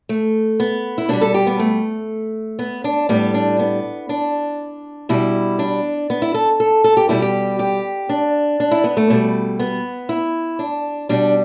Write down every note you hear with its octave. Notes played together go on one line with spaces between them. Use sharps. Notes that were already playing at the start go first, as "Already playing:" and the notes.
A3
B3
E4
B2 G3 D4
A4
G4
B3
A3
B3
D4
A2 G3 B3
D4
B3
D4
B2 G3 E4
D4
B3
E4
A4
A4
A4
G4
B2 G3 E4
G4
G4
D4
D4
E4
B3
A3
B2 G3
B3
E4
D4
B2 G3 D4